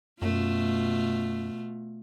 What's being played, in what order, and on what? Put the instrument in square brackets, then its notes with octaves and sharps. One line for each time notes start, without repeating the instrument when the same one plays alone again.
[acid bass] F#2 [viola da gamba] B2 A3 F4